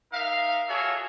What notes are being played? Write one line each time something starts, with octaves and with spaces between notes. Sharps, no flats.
D#4 A#4 E5 F5
F4 F#4 G#4 A4 C#5 E5